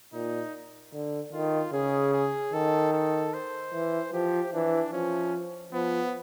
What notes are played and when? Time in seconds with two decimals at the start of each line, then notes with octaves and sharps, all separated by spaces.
0.13 A#2 D#4
0.93 D3
1.33 D#3 F4
1.73 C#3 G#4
2.13 G#4
2.53 D#3 A4
2.93 A4
3.33 C5
3.73 E3
4.13 F3 G4
4.53 E3 D4
4.92 F3 C#4
5.73 F3 B3